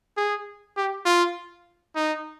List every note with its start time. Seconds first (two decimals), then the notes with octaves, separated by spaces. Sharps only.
0.17 G#4
0.77 G4
1.06 F4
1.95 D#4